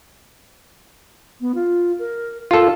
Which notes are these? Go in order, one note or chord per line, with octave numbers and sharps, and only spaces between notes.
B3
F4
A#4
F4 A4 A#4